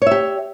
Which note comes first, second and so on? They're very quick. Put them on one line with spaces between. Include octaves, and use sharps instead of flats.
C#5 E5 G4